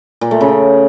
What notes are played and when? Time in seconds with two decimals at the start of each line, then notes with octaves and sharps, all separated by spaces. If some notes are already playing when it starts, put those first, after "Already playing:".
0.21 A#2
0.31 A3
0.41 C#3